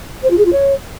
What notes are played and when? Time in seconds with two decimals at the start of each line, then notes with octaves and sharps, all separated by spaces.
0.23 C5
0.30 F4
0.38 G#4
0.45 F4
0.53 C#5